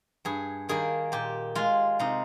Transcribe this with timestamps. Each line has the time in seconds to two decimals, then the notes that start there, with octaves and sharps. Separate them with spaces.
0.25 G2 G#4
0.69 D#3 G3 A#3 G#4
1.12 A#2 G4
1.55 G#3 F4
1.99 C3 D#4